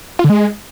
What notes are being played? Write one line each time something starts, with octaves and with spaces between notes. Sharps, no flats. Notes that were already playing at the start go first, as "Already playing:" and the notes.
F4
D3
G#3